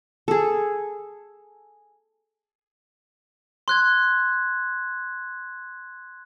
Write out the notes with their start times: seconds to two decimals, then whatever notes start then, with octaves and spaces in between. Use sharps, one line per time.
0.28 G#4 A4
3.68 C6 F#6 G#6